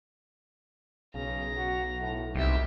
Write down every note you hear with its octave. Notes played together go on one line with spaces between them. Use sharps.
B1 C#3 A#5
F#4
A2
C2 D#4 G4 E5